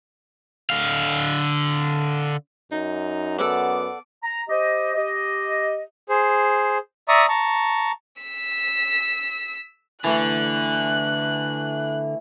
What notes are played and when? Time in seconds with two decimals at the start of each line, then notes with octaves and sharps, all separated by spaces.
0.70 D3 F5
2.72 F#2 D#4
3.38 B3 A4 D5 F#5 D6
4.23 A#5
4.49 G4 C5 D#5
4.96 G4 D#5
6.09 G#4 C5
7.08 D5 E5 A#5 C#6 D#6
7.29 A5 A#5 C#6
8.22 E6 B6
10.04 D3 E3 A3 F#6